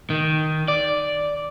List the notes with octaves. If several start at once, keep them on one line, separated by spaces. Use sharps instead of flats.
D#3
D5